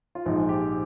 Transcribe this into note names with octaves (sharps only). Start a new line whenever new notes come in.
F4
A#1 G#2 F3 G#3 D#4
G4